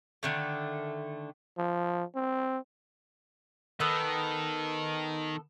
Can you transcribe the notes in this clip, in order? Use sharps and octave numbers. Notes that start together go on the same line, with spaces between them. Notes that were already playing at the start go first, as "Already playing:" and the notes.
D3 D#3 A3
F3
C4
D#3 B3 A4 F#6